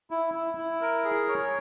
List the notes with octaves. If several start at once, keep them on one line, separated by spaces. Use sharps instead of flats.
E4
E4
E4
A#4
G#4
C#5